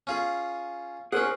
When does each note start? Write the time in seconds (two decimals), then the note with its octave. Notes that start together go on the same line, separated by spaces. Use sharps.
0.07 C#4 F4 G#4
1.12 C#4 G#4 A#4 C5 F#5